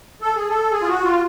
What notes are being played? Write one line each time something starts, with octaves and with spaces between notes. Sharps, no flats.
A4
G#4
A4
G#4
F4
F#4
F4